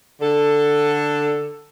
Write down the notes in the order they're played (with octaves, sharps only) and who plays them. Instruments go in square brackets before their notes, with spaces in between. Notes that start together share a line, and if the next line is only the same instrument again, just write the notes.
[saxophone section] D3 A4